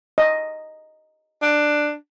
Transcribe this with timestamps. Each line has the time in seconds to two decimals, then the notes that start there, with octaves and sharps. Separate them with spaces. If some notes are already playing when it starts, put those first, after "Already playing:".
0.18 D#5
1.42 D4